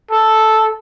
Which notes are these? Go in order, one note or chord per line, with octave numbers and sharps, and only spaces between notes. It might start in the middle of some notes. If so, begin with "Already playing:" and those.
A4